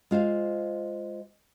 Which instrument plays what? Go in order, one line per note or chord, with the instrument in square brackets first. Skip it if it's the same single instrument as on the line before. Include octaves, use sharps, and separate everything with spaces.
[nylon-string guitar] G#3 F4 C5 F5